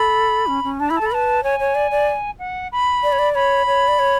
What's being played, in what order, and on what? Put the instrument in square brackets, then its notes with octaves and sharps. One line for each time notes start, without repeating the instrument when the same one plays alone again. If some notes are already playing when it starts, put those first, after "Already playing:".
Already playing: [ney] A4 [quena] B5
[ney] C#4
C#4
[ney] D4 [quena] A5
[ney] E4 [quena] B5
[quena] A5
[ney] A4 [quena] B5
[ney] B4 [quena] A5
[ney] C#5 [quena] G#5
[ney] C#5
D5
D5
[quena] F#5
B5
[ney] D5
C#5
D5
[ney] C#5 [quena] B5
[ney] C#5
D5
C#5